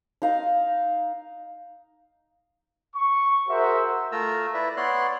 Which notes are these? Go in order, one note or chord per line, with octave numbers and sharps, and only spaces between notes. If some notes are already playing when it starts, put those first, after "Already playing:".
D#4 F5 A#5
C#6
F#4 G#4 A#4 C5 E5
A3 F4 A#4 A#5 E6
E4 B4 D5 E5
B3 C#5 D5 C6 F#6